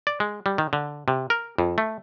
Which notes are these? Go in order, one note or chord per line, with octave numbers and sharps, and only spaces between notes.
D5
G#3
G3
D#3
D3
C3
A#4
F2
A3